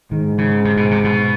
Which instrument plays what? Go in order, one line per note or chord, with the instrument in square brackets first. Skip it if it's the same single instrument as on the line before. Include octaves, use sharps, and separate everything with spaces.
[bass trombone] G#2 [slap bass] D#3
[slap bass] C#3
C3
B2
C3
B2